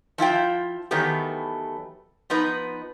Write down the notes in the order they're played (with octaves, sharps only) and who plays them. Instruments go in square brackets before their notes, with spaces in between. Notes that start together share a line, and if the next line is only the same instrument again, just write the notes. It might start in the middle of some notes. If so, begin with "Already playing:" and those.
[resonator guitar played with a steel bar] F3 E4 F4 G5
D#3 E3 F#3 A3 B3 G4
F3 B3 D#4 B4